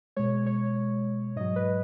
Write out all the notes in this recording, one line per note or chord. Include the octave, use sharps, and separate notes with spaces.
B2 G#3 C#5
C#5
G#2 F#3 D#5
B4